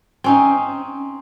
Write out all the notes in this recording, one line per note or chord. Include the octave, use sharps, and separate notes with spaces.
C4 C#4 D#4